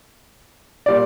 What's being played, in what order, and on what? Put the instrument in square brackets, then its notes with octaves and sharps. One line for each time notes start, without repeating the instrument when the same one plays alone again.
[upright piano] A#2 G3 D5